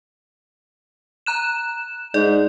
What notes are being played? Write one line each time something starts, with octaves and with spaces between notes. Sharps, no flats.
A#5 F#6 E7
G#2 D5